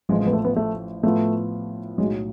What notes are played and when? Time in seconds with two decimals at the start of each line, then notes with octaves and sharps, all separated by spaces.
0.09 A1 A2 F3 G#3
0.21 G#3
0.27 B3
0.33 A3
0.44 B3
0.56 A3
1.03 A2 F3 A3 B3 F4
1.98 B1 A2 F#3 G#3